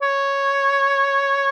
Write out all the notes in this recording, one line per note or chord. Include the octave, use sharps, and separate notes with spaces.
C#5